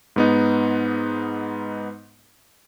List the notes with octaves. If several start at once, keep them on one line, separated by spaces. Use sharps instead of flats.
G#2 B3 D#4